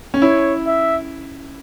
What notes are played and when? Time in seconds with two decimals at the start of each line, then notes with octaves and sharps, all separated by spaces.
0.14 C#4
0.22 E4 C#5
0.67 E5